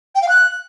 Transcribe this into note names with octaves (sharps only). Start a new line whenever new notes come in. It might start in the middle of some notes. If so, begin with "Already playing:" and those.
G5
F5
F#6